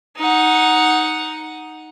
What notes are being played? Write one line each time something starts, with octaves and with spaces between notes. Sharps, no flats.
D#4 F#5